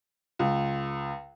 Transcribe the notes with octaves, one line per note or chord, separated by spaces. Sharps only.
C#2